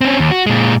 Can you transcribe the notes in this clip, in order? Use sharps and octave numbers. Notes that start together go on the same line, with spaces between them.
C4 C#4
D#2
F#4
A#2 G#3